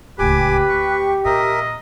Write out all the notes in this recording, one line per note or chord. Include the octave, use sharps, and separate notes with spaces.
D1 C#2 G4 B4 G#5 D6
D2 C#6
A#2 A#4 D#5 E5